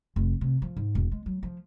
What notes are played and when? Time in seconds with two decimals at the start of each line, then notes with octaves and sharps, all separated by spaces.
0.16 F1
0.41 C3
0.62 F3
0.77 G#2
0.95 E1
1.11 G#3
1.26 F#3
1.43 F3